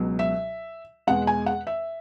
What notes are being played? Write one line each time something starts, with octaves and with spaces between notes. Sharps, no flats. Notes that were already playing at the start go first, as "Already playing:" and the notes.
Already playing: C#2 B2 F#3
E5
E2 B2 G#3 F#5
G#5
F#5
E5